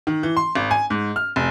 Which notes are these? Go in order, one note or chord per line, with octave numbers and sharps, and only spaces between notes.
D#3
E3
C6
G#1
G#5
G#2
F6
F1